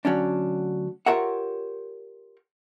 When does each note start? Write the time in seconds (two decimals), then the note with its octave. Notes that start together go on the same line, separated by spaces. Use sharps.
0.05 D2 F#3 C#4 D4
1.06 F4 G4 A#4 C#5 E5 F#5